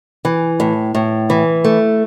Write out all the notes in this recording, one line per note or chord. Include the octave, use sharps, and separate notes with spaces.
E3
A2
A2
E3
A3